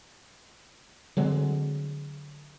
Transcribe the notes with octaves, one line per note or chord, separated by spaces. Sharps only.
D3 F#3 G#3 C4